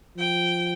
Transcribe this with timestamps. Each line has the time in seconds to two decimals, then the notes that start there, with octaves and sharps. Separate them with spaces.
0.18 F3 G5